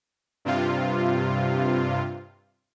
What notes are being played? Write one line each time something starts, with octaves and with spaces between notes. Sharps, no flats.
G2 C3 F4